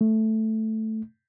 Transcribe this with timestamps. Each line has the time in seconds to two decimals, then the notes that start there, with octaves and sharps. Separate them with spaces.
0.01 A3